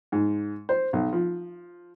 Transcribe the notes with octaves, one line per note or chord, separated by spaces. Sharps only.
G#2
C5
B1
F3